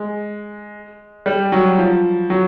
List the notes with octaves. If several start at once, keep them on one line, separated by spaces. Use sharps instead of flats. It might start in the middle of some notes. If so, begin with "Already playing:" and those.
Already playing: G#3
G3
F#3
F3
F#3